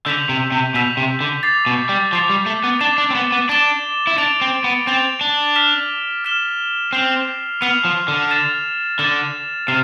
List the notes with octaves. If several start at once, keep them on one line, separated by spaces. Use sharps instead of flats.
D3 E6 G6 B6 F7
C3
C3
B2 E6 G6 B6 F7
C3
D3
D6 A6 C7 F7
B2
G3
F3 D6 A6 C7 F7
G3
A3
B3
D4 D6 A6 E7 G7
D4
C4
B3
B3
D4 D6 A6 E7 G7
E4
D4 A6 D7 F7
C4
B3
C4 A6 D7 F7
D4
F6 B6 E7 G7
F6 B6 E7 G7
C4 F6 C7 F7
B3 F6 C7 F7
F3
D3
F6 A6 E7
D3 F6 A6 E7
C3 F6 C7